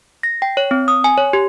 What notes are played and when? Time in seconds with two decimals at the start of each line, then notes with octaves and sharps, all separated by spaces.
0.23 A#6
0.42 G5
0.57 C#5
0.71 C4
0.88 D#6
1.04 G#5
1.18 C#5
1.33 G4